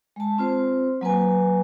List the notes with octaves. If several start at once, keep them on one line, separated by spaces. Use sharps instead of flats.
G#3 A5
C4 F4 C5
F#3 A#3 B4 G#5